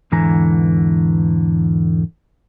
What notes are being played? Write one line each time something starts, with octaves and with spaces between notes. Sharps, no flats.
E2 G#2 D3 E3 G#5 A#5